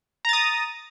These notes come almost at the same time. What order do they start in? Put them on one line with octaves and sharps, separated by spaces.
A#5 A6 D#6